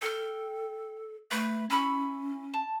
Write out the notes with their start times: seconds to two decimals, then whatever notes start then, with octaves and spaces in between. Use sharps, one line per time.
0.02 A4 G5 F6
1.31 A3 B4
1.70 C#4 E4 B5 C#6
2.54 A5